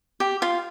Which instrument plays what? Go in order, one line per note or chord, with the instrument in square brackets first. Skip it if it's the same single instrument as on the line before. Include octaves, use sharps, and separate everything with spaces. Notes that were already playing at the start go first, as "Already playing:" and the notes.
[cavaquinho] G4
F4